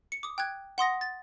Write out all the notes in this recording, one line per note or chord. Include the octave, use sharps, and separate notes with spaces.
C#7
D6 D#6
G5 F#6 G#6
F#5 C6 D#6 A#6
A6